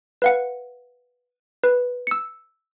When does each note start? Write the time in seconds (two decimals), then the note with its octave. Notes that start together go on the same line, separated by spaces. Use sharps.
0.22 B4 F5 F#5
1.64 B4
2.07 E6 C#7